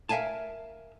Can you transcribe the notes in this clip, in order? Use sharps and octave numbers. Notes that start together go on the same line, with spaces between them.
A#4 E5 F5 G#5 A5